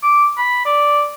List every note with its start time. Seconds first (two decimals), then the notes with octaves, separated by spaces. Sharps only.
0.03 D6
0.37 B5
0.66 D5